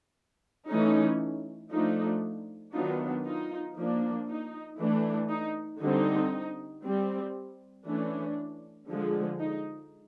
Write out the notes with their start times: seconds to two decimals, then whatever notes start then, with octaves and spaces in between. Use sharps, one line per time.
0.68 E3 A3 C#4 D#4
1.71 F3 A3 D4 D#4
2.73 D#3 F#3 B3 D4 D#4 F4
3.24 D#4 F4
3.76 F3 A#3 D4
4.27 D#4
4.79 E3 A3 D4
5.30 D#4
5.80 D3 G3 C4 D#4
6.84 G3 C4
7.85 E3 A3 C#4 D4
8.88 D3 F3 G#3
9.40 D#4